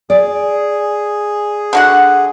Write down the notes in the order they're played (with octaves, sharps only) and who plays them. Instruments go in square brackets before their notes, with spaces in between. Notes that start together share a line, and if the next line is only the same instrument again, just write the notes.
[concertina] G#4 [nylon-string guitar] D5
[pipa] D3 F#4 F#5